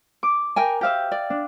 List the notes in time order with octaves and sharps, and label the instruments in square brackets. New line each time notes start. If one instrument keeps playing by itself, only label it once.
[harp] D6
[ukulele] A#4 G5 G#5
[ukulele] G4 C5 [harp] E5 F5 G5
[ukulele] D5
[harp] D4